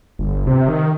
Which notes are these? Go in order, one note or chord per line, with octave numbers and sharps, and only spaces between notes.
G1
C3
D#3